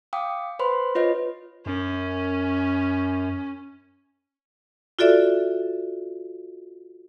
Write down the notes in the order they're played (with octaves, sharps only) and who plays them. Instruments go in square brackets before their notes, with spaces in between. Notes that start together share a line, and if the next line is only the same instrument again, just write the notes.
[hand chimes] F5 G5 D6 D#6
B4 C5 B5 C6
F4 B4 C#5 D#5
[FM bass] F#2 [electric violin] C#4
[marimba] F4 F#4 A4 D5 E5